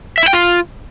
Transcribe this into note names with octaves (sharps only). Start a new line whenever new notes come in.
E5
E4
G5
F4